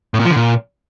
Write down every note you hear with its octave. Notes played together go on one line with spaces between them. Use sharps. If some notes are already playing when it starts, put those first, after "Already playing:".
A2
A#2
F3
D3
A#2